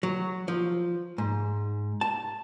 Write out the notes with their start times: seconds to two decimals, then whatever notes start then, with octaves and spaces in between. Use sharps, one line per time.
0.03 F#3
0.48 F3
1.18 G#2
2.01 A5